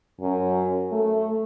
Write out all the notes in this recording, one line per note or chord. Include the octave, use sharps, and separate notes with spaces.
F#2
A3